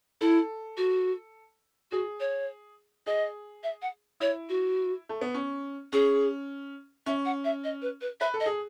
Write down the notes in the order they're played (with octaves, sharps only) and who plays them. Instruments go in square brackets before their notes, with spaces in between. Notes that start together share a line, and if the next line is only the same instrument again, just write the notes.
[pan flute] E4 [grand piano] A4
[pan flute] F#4
[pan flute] F#4 [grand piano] G#4
[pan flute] C#5
[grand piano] G#4 [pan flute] D#5
[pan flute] E5
F#5
[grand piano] E4 [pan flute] C#5
[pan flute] F#4
[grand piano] A3
B3
C#4
[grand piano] C#4 [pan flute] G#4
[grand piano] C#4 [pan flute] E5
[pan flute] F#5
E5
D#5
B4
B4
[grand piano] B4 [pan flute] E5
[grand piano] A4
[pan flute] D#5
[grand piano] G#4